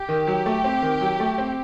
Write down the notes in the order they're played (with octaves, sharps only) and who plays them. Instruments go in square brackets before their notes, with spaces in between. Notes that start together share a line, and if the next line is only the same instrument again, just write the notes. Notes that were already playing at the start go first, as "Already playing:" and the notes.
Already playing: [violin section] G4
[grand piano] D#3
F#3
A3
C4
D#3
F#3
A3
C4